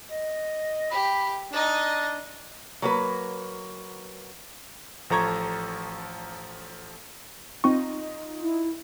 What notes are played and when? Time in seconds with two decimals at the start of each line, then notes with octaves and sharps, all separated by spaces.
0.11 D#5
0.91 G4 B5
1.53 D4 D#4 D#5
2.82 F#3 A#3 B4
5.10 A1 F3 A4 A#5 C#6 G#6
7.64 C4 D#4 F4 D#5 C#6
8.42 E4